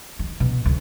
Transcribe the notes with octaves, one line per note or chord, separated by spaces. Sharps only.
D#3
B2
D2